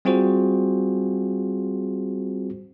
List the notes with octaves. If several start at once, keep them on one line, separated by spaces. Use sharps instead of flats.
G3 C4 F4 F#4 G#4 C5